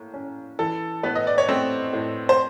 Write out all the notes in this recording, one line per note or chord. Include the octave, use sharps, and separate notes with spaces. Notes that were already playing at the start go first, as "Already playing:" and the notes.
Already playing: A2 A#3
C#4
E3 A4
A2 B3 B4
D#5
D5
C#5
A3 C4 C5
A2
C5